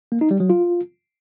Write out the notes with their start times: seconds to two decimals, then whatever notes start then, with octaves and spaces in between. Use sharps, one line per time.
0.12 A#3
0.21 D#4
0.31 G3
0.40 F#3
0.50 F4